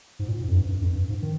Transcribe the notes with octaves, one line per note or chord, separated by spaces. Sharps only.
G#2
A#2
G#2
F2
G2
G2
F2
G2
G#2
D#3